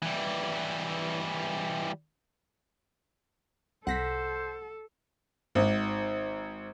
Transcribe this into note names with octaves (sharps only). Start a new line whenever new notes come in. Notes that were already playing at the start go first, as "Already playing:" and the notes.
E3 G3
C2 A4 C5 F#5 A#6 B6
G#1